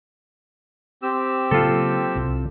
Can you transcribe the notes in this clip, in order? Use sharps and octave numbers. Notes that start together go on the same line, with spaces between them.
C4 G4 E6
C#3 F#3 A#3 F4 A4
C2 C3